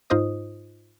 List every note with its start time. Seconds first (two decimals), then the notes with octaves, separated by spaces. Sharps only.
0.10 G#2 D#4 F4 C5 D#5 D#6